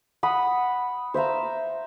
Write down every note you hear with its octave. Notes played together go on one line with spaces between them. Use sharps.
F#5 B5 D#6
C5 E5 F5 A#5